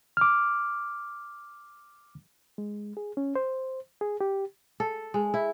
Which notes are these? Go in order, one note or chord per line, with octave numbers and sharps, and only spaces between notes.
D6 F6
G#3
G#4
C#4
C5
G#4
G4
A4
G#3
E4